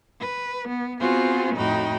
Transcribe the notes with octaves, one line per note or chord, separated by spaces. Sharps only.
B4
B3
B3 C4 F4 F#4 G#4 C5
F2 A2 D#4 F#4 G5 B5